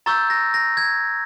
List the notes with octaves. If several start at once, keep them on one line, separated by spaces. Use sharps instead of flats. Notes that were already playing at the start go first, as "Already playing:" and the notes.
A#5 C#6 E6 G6 A6
A#6
A#6
G#6